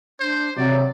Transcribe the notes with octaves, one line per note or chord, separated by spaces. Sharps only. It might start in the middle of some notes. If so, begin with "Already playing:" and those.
D4 C5
C3 F#3 C4 D5